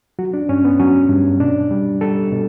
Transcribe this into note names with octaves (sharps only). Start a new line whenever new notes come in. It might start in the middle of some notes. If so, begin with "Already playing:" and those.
F#3 F#4
D4
G2 C#4
B3
F#3 C#4
G2
B2 D4
G3
G3 A4
B2